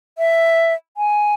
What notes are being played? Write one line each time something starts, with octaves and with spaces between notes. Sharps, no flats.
E5
G#5